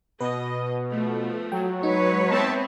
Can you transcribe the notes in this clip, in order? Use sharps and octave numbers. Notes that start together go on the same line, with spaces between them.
B2 B4 D#5
F3 A3
F#3 G5
G#3 D#4 B4 C#5
B3 C4 E5 A5